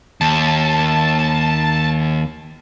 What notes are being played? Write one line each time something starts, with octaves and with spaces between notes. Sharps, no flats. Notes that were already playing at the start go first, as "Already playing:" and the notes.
D#2 A5